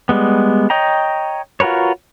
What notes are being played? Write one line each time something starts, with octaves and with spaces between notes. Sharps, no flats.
G3 G#3 B3
C#5 D#5 G5 A#5
F4 F#4 A#4 B4 C#5